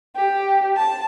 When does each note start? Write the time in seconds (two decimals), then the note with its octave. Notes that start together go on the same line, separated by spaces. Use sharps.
0.16 G4
0.77 A5